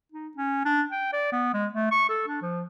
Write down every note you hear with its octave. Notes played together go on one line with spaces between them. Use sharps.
D#4
C#4
D4
G5
D5
B3
G#3
A3
C#6
A4
D4
F3